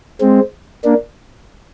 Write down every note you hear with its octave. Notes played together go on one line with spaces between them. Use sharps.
G#3 C4
A#3 D4